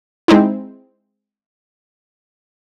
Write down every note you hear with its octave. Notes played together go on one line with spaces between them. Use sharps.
G#3 C4 D#4 E4